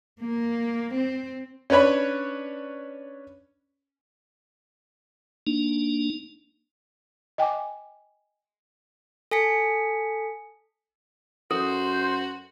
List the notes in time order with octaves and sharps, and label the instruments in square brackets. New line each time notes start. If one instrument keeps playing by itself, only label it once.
[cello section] A#3
C4
[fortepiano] C#4 D4 B4 C#5 B5
[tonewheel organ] A#3 D4 D#4
[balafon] D#5 G5 G#5 D6
[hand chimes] A4 G#5 B6 C#7
[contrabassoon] F#2 [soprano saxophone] F#4 [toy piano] A4 [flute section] C5